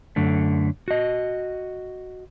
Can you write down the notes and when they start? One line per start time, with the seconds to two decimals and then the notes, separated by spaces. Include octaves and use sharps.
0.16 F#2 D3 A3
0.88 F#4 D#5